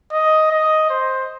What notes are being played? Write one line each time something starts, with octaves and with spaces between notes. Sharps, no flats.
D#5
D#5
C5